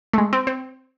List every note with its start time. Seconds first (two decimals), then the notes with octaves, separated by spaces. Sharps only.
0.13 A3
0.18 G#3
0.33 C4
0.47 C4